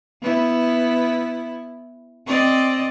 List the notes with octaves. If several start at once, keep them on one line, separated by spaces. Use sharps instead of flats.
B3 E4
C4 D5 D#5